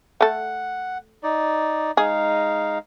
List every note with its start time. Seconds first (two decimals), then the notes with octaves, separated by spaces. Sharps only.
0.21 A3 A4 F#5
1.23 D#4 D5
1.97 G#3 D#4 G#4 F5